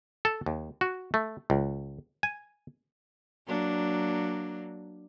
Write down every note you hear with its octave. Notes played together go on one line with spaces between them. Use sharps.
A4
D#2
F#4
A3
C#2
G#5
F#3 A#3 D4